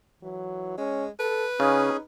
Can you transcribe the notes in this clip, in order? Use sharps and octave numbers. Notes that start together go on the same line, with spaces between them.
E3 F#3
G#3 C#4
A4 B4
C#3 C#4 D#4 G#4